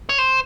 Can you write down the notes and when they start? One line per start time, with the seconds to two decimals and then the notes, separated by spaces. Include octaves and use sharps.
0.09 C#5
0.18 C5